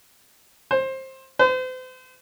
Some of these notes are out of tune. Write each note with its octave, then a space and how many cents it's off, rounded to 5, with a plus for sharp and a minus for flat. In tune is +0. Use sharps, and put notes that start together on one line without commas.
C5 +20
C5 -40